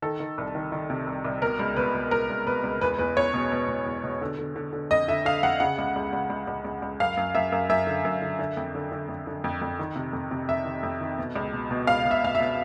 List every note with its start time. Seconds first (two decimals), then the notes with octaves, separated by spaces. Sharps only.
0.02 D#3 A4
0.20 D#3
0.38 C2
0.55 D#3
0.72 D#3
0.90 C3
1.07 C2
1.25 C2
1.42 B2 A#4
1.59 C#2
1.76 B2 B4
1.94 B2
2.11 C#2 A#4
2.30 C#2
2.47 B2 B4
2.64 C#2
2.81 E2 B4
2.99 E2 B4
3.17 E2 C#5
3.34 B2
3.52 B2
3.68 B2
3.86 E2
4.04 B2
4.22 D3
4.39 D3
4.56 D3
4.73 D3
4.91 F2 D#5
5.08 D3 E5
5.25 D3 F5
5.43 F2 F#5
5.60 C#3 F#5
5.78 C#2
5.96 C#2
6.13 C#2
6.30 C#2
6.47 C#2
6.65 C#2
6.82 C#2
7.00 F#2 F5
7.17 F#2
7.35 F#2 E5
7.52 F#2
7.69 F#2 E5
7.87 D3
8.05 F#2
8.22 D3
8.39 D3
8.57 F2
8.75 D3
8.92 D3
9.08 F2
9.27 D3
9.44 F2
9.62 F2
9.79 D#3
9.96 C3
10.13 F2
10.31 C3
10.49 F2 E5
10.65 D#3
10.83 F2
11.01 D#3
11.18 B2
11.36 C#2
11.53 B2
11.71 B2
11.87 C#2 F5
12.05 B2
12.11 E5
12.23 B2 F5
12.35 E5
12.40 B2